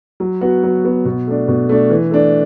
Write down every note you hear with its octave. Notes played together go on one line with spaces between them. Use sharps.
F#3
B3 F#4
F#3
B3 F#4
B2
A3 D4
B2
A3 D4
E3
A3 D4